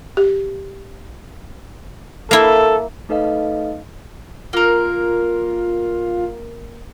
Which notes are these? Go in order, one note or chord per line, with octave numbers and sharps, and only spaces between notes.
G4
A#3 E4 A4
A3 D#4 A4 B4 D#5 F5
A#3 F4 A#4